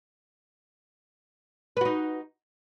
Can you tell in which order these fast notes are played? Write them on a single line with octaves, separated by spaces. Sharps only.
B4 F#4 D#4